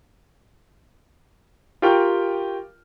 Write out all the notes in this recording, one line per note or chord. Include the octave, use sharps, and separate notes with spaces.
F4 G4 A#4 G5 C#6 F6